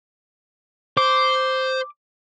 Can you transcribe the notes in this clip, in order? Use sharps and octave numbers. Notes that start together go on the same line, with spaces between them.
C5 D6